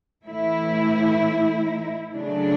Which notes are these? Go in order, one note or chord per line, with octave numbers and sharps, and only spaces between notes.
A2 E3 A3 E4
C#3 F#3 A3 D4